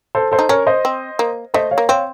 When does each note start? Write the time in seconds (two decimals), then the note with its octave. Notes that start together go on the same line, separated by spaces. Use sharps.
0.15 A4 C5
0.31 A4 C5
0.39 D#4
0.49 C#4 A#4 C#5
0.67 C5 D#5
0.85 C4
1.19 A#3
1.54 A3 C5 D#5
1.71 C#5 F5
1.78 A#3
1.88 C4 C#5 F5